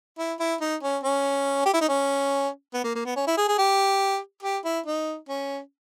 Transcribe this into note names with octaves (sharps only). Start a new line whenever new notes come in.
E4
E4
D#4
C#4
C#4
G4
E4
D#4
C#4
B3
A#3
A#3
B3
C#4
E4
G#4
G#4
G4
G4
E4
D#4
C#4